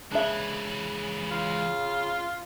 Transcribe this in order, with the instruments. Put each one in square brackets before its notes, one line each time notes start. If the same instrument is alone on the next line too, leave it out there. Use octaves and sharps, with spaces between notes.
[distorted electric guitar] C#2 E3 [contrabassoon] C#3 [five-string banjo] D4 E5
[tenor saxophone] F4